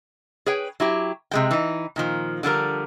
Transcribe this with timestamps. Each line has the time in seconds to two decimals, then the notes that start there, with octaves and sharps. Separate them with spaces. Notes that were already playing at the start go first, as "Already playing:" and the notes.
0.46 G#4 B4 C#5 G5
0.80 F#3 E4 G4
1.31 C3 G#3 G5
1.51 E3 D#4
1.96 A#2 D#3 F3
2.43 D3 F3 G3 A#4